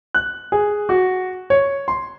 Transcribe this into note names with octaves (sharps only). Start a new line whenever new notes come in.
F#6
G#4
F#4
C#5
C6